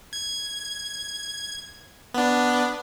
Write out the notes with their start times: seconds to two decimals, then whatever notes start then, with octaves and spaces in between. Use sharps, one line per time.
0.13 G#6
2.14 B3 D4